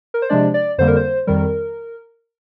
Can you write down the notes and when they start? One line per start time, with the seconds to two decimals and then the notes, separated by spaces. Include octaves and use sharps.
0.14 A#4
0.22 C5
0.29 C3 F3 G#3 D4 D5
0.54 D5
0.78 F2 D3 G3 A#3 C5
0.87 A#4
0.96 C5
1.27 F2 D#3 G3 A#4